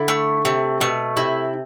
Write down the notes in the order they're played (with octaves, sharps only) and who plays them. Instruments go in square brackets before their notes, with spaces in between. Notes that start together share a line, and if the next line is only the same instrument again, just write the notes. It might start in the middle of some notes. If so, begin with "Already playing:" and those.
Already playing: [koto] D3 [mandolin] E4
[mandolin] A3
[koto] C3 [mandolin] A3
[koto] B2 [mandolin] A3
[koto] C3 [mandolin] E4